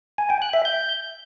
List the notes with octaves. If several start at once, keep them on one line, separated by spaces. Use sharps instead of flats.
G#5
G5
F#6
E5
G6